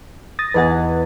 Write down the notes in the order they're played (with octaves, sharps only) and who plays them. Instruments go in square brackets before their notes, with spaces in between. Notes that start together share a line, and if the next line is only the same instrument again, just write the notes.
[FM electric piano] D#6 A6 A#6
[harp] E2 G#4 A6 [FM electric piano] B4 D#5 F#5